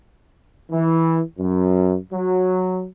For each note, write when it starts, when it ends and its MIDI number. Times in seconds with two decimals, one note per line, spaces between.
0.71 1.20 52
1.39 1.97 42
2.13 2.86 54